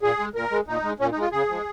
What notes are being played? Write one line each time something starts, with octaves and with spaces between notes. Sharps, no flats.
A#2 G#4
G#3
A#2 A#4
G#3
A#2 D#4
G#3
A#2 C#4
D#4
G#3
F4
C#3 G#4
F3 G#3